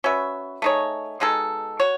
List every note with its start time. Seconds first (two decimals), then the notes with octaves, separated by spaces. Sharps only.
0.04 C#4 F#4 B4 E5
0.62 A3 D#4 G#4 C#5
1.20 B2 G#3 D#4 A4
1.80 F#4 C#5